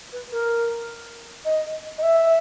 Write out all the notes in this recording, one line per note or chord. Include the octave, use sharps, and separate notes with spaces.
B4
A#4
D#5
D#5
E5